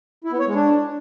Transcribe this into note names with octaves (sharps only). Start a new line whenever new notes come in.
E4
B3
C#5
G#3
D4